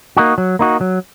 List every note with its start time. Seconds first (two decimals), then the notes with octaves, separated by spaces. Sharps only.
0.17 A#3 D#4 F#4
0.38 F#3
0.59 A#3 D#4 F#4
0.81 F#3